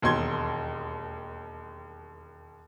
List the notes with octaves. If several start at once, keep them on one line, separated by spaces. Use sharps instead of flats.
E1 D#2 D#5 C6 G#6